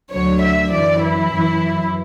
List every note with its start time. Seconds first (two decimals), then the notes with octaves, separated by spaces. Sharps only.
0.10 D2 D3 F#3 C#5
0.41 E5
0.72 F#2 E3 D5
1.02 E4
1.33 F#2 E3